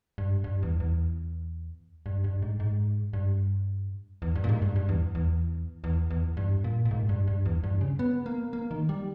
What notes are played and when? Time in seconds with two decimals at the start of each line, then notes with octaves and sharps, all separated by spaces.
0.18 G2
0.44 G2
0.63 E2
0.80 E2
2.06 G2
2.24 G2
2.42 G#2
2.60 G#2
3.13 G2
4.22 E2
4.36 G2
4.44 A#2
4.49 G#2
4.62 G2
4.76 G2
4.89 E2
5.15 E2
5.84 E2
6.11 E2
6.37 G2
6.64 A#2
6.85 A#2
6.91 G#2
7.09 G2
7.28 G2
7.46 E2
7.64 G2
7.81 C#3
7.99 B3
8.26 A#3
8.53 A#3
8.71 D#3
8.89 G3